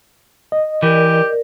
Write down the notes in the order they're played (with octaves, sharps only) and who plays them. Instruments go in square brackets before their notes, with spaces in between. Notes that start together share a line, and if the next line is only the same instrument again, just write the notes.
[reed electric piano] D#5
[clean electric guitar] E3 [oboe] G4 [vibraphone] A#4 D5